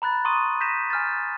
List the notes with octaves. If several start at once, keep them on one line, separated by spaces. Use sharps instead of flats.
A#5 B5 F#6 A6
A#5 C6 C#6 D#6 D#7
G6 A#6 B6 D#7 E7
G#5 F6 G6 A6